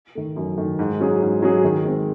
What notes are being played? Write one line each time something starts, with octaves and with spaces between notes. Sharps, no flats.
D#3 A3
F#2
D#3 A3
G#2
F#3 C#4 G#4
G#2
F#3 C#4 G#4
D#3
G#3 C4